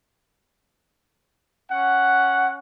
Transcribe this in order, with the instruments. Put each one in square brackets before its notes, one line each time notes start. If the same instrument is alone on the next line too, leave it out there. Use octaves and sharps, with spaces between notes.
[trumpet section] C#4 F#5